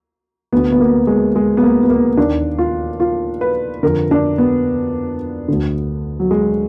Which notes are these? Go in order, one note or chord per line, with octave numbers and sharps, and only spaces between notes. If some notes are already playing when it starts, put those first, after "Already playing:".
D2 D3 B3
B3
A#3
G#3
G#3
B3
A#3
B3
A#3
D#2 D#3 D4
F4
F4
B4
F2 D3 A#4
D4
B3
D2 D3
F#3
G#3